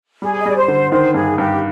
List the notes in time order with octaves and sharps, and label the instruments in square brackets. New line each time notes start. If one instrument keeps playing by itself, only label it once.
[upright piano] G3 [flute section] G#4
[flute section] D#5
[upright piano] G3 [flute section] D5
[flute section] C5
[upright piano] D3
[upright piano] D#3 [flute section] C5
[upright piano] G2 [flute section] G#4
[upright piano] G2 [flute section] G4